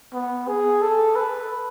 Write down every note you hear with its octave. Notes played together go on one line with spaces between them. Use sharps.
B3
G#4
A4
B4